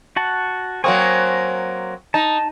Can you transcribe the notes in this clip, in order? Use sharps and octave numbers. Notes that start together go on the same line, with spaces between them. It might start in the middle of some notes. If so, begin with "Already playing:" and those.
F#4 F#5 A5
F#3 A#3 C4 G#5 C#6 D#6
D#4 A5